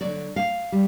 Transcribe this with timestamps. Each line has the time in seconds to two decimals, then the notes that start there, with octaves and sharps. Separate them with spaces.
0.01 D3 F#3 D5
0.36 F5
0.72 G3